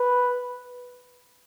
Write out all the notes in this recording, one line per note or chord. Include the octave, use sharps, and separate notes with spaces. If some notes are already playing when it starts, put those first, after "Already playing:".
Already playing: B4